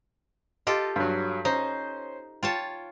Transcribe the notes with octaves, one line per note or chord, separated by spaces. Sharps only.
F4 G4 A4 D#5 C6
G2 F#3
C#4 D#4 C5
F4 C#5 G5 A5